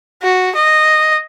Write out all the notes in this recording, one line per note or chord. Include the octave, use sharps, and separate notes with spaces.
F#4
D#5